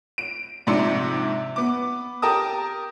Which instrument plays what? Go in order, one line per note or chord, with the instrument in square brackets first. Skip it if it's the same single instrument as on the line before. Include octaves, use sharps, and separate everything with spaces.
[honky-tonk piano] D7
A#1 G#2 C3 D4 C6 C#7
B3 D6
G4 A#4 A5 D#6